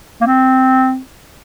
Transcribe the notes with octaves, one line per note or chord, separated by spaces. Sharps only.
A#3
C4